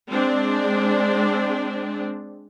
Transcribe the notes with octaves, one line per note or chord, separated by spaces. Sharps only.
G#3 C4 D4